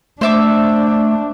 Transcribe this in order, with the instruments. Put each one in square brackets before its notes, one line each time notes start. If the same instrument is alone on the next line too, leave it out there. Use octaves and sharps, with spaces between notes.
[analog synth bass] A3 [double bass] D4 [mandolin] C5 E5 D6